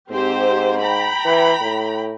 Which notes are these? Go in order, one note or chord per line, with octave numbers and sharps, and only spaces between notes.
G#2 C4 G4 C5
G5 A#5 B5
E3
A2